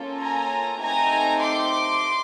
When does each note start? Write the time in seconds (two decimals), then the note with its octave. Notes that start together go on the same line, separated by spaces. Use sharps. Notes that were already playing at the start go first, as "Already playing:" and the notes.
Already playing: A#3 C#4 F4 A4
0.20 G#5 A#5
0.80 A3 C4 D#4 G4 G#5 A#5
1.40 C6 D6